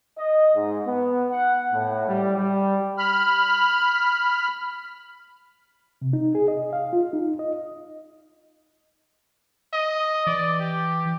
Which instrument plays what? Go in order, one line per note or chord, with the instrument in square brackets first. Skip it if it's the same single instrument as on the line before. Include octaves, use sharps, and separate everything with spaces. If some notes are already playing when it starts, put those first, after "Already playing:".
[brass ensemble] D#5
G#2
B3
F#5
A2
G3
G3
[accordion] B5 F6
[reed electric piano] C3
D#4
G#4
D#5
F5
F4
D#4
D#5
[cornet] D#5
[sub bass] E3 [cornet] D5
[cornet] G4